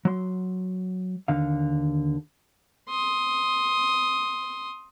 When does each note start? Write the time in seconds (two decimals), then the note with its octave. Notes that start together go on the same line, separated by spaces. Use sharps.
0.05 F#3 C6
1.28 D#2 D3 F5
2.89 C6 D#6